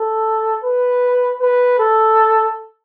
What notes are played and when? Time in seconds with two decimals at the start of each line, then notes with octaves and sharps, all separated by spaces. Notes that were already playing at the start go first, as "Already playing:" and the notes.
Already playing: A4
0.64 B4
1.40 B4
1.79 A4